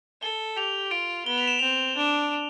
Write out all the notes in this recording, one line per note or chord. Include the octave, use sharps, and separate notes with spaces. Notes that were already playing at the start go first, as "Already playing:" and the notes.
A4 G7
G4 F7
F4 D7
B3 G7
F7
E7
C4 F7
D4